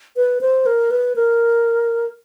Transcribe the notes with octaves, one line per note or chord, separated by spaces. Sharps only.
B4
C5
A#4
B4
A#4